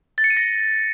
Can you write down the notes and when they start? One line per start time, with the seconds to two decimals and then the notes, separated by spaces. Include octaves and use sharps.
0.18 A6
0.24 C#7
0.30 D#7
0.37 A#6